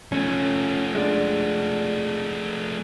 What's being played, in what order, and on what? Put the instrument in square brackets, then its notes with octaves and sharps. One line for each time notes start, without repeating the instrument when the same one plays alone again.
[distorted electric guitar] F3 A3 [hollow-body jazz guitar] C#4
[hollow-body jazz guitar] G#3 D4